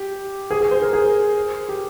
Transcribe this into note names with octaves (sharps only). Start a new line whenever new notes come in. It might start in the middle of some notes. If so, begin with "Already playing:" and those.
Already playing: G4
G#4
G#4
C5
A#4
G#4
G4